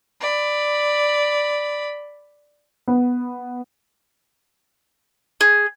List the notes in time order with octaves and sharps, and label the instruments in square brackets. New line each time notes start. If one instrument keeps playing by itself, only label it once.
[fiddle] D5 B5
[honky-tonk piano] B3
[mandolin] G#4